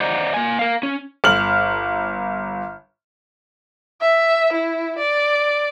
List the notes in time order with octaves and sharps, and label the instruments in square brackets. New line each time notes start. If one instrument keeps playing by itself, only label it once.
[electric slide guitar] C5 D5 D#5 F#5 A#5
A#3 G#5
A#4 F5
C#4
[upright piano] G1 F6 F#7
[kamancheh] E5
E4
D5